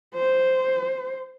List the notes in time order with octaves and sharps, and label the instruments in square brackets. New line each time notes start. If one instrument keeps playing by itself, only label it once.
[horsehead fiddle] C5